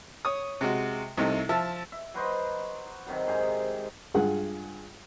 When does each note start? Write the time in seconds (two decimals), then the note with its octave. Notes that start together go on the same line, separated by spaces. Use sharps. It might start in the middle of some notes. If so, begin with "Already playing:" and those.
0.25 C#5 D#6
0.61 C3 G#3 F#4
1.18 C2 C3 A3 D#4
1.49 F3 E5 A5
1.92 E5
2.14 F#3 B4 C5 D#5
3.07 C3 D#3 F#3
3.27 G#2 G#4 G5 A#5
4.14 G2 G#3 F4 G#4 F#5